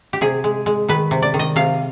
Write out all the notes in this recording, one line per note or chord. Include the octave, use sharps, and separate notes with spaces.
G4
C3 G#4
G#3
G#3
D#3 B4
C3
D5
D#3
D#5
C3 F5